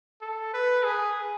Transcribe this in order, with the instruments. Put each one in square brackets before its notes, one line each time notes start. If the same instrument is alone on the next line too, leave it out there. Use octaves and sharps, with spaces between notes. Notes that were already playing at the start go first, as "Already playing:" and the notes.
[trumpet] A4
B4
G#4